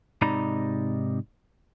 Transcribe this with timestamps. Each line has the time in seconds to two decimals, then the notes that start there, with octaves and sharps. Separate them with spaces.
0.22 G#2 C3 D#4 D5 A#5 B5